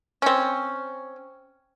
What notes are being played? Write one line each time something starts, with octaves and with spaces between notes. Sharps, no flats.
C4 C#4